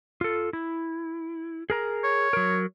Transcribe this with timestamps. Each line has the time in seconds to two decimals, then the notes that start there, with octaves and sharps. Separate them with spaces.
0.21 F4 A4
0.53 E4
1.70 G#4 A#4 A#5
2.04 C#5
2.33 F#3 A#4